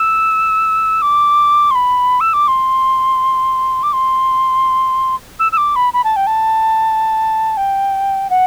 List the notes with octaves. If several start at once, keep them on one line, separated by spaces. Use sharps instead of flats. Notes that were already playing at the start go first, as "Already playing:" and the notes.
Already playing: E6
D6
C6
B5
E6
D6
C6
D6
C6
E6
E6
D6
B5
B5
A5
G5
A5
G5
F#5